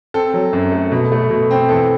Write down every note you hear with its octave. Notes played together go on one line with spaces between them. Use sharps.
C4 A4
F#3
F#2
A3
B2
A3
B2
C4
E2 A4